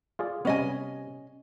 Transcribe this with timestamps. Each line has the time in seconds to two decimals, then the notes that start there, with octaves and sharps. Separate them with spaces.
0.19 F4 G#4 D5
0.45 C3 G3 B3 C#4 D#5 G#5